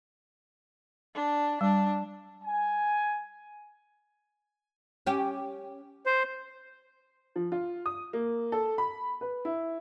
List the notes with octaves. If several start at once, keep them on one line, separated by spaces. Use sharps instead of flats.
D4
G3 D4
G#5
C#4 G4
C5
F3
F4
D#6
A#3
A4
B5
B4
E4